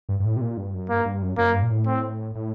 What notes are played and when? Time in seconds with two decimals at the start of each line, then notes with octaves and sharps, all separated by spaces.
0.09 G2
0.20 G2
0.24 A2
0.37 C3
0.41 A#2
0.57 G2
0.74 F#2
0.89 G2 A#3
1.05 G2
1.22 F#2
1.38 F#2 A#3
1.54 G2
1.62 A#2
1.70 A2
1.86 C4
2.35 A2